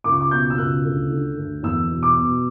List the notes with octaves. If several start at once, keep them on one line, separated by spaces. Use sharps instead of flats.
C#2 D6
C#6
D6
B2 G6
E6
C#2 F#6
D2
D3
D2
E2 E6
B2
D6
B2